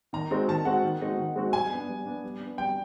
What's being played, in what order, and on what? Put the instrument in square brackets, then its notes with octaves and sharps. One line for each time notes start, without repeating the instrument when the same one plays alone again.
[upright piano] D#3 [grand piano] A#5
[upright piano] G#3 C4 D#4 F#4
[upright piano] D#3 [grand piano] A5
[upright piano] G#3 C4 D#4 F#4 [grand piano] F#5
[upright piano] D#3
G#3 C4 D#4 F#4
D#3
G#3 C4 D#4 F#4
[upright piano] G3 [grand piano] G#5
[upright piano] B3 D4
G3
B3 D4
G3
B3 D4
[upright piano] G3 [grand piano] G5